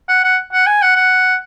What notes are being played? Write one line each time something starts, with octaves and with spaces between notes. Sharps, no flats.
F#5
F#5
F#5
G#5
F#5
F#5